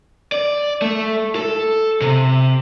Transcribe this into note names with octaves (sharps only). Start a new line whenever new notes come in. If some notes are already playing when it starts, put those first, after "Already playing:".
D5
A3
A4
C3